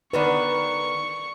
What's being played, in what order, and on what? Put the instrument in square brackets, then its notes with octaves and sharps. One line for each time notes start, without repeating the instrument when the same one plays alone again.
[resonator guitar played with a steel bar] D3 D#3 B3 [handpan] B4 D5 [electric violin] C#6